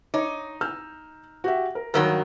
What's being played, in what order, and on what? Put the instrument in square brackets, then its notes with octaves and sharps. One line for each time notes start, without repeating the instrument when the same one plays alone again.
[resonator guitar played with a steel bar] D#4 [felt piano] C#5 D6
[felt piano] E6 F6 G6
F#4 G4 E5
A#4
[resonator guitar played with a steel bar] G2 D#3 F#3 [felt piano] A#4 E6